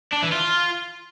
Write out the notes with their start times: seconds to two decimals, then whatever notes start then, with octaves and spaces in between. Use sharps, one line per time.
0.12 D4
0.22 E3
0.32 F4